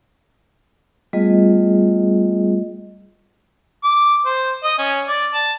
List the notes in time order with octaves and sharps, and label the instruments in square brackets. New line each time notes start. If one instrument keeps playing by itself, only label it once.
[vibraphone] G3 A3 B3 F4 G#4 D#5
[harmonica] D6
C5
D#5
C#4
D5
A5